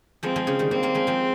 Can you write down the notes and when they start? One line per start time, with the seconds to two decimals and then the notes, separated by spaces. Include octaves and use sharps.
0.23 F3 G#3 C4
0.36 F3 G#3
0.47 C#3 F3
0.59 D#3 G3
0.71 G3 A#3 C4
0.83 G3 A#3
0.95 F3 G#3
1.07 F3 G#3